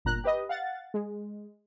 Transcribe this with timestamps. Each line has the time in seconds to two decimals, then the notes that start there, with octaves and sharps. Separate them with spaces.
0.05 G1 A#2 A#5 F#6
0.24 G4 B4 D#5
0.49 F5 F#5 A6
0.94 G#3